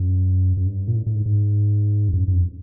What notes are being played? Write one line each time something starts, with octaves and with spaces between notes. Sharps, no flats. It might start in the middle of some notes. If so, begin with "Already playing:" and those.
Already playing: F#2
F#2
G2
A#2
A2
A2
G#2
G#2
F2
F#2
F#2
F2